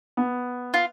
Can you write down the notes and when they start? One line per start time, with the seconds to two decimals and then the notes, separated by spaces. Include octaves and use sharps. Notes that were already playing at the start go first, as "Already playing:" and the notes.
0.17 B3
0.74 F4